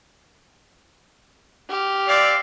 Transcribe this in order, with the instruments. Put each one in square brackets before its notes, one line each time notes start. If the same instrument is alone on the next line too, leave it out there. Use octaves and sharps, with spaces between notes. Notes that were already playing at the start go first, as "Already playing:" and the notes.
[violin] G4 F6
[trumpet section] C4 E5 F5 [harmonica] D5